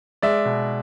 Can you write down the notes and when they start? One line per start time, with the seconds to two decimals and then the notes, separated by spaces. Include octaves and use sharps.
0.22 G#3 D5 E5
0.45 B2